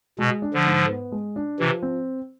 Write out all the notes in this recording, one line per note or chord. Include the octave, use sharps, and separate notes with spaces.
B2 G#3
D4
D3 F3
G#2
B3
G#3
D4
C3 E3 F3
C4